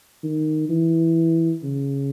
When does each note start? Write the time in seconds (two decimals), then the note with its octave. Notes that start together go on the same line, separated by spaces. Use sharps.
0.23 D#3
0.69 E3
1.63 C#3